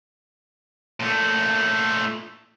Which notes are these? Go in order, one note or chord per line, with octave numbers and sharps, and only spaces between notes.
A#2 A3